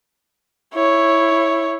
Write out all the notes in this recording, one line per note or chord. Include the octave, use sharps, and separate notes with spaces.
E4 C#5